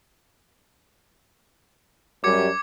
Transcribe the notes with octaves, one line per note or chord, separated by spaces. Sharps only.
F#2 G3 D6 G#6 C#7